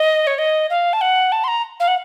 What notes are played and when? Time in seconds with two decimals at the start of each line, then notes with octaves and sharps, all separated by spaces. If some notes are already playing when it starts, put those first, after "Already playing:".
Already playing: D#5
0.27 C#5
0.38 D#5
0.70 F5
0.93 A5
1.01 F#5
1.32 A5
1.44 C6
1.48 A#5
1.80 F5
1.88 F#5